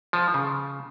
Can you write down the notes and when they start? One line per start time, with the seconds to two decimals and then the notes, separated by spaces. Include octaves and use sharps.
0.13 F3
0.34 C#3